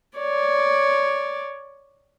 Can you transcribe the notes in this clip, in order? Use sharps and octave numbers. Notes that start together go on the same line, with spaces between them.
C#5 D5